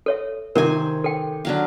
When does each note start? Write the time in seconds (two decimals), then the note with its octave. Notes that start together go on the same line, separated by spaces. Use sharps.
0.06 A4 C#5 E5
0.55 C3 D#3 A#4 C5 E5 G#5
1.04 A4 G5
1.45 D3 F#3 F5